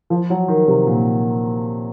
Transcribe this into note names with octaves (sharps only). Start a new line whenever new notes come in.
F3
F#3
D#3
C3
A#2